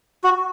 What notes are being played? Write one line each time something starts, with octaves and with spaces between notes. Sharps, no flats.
F#4